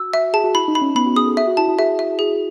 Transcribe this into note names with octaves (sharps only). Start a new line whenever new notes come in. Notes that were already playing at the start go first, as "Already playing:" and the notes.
Already playing: F#4 E6
E5
G#4 A5
F#4
E4 B5
D#4
B5
C#4
B3 B5
F#4
G#4 D#6
A4
G#4 E5
F#4
E4 A5
E4
G#4 E5
E5
G#4